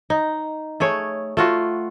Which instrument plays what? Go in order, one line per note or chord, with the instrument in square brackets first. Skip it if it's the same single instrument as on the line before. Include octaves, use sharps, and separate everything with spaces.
[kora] D#4
A3 G#4 C#5
A3 F4 F#4